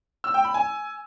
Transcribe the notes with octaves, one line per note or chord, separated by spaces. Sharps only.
E6
G5
B5
G#5